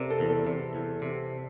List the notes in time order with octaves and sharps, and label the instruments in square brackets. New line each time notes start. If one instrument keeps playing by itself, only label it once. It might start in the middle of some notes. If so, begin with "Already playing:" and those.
Already playing: [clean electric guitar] C3 [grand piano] A4 A#4 D5
[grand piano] A4
[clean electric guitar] E2
[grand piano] A4
[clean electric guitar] C3
E2
C3